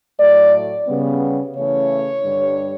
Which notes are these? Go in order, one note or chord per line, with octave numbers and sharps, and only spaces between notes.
A2 F#3 A3 D5
C#3 G3 B3
C#3 E3 A3 C#5
G2 D3 G3